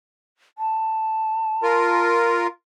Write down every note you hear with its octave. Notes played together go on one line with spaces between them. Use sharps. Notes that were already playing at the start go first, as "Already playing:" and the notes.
A5
F4 A#4